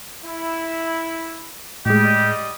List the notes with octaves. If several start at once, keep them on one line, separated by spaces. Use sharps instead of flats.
E4
A2 G3 G#3 G4 D#5